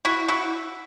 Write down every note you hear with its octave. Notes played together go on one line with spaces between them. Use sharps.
E4 F#4
E4 F#4